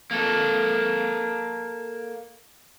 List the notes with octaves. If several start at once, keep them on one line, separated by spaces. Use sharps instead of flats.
A#3 A4